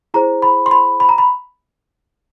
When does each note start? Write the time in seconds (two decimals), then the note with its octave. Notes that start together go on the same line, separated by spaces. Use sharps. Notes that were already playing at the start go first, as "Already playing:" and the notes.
0.14 E4 G#4 C5 A#5
0.42 B5
0.66 C6
0.71 B5
1.00 B5
1.09 A#5
1.18 B5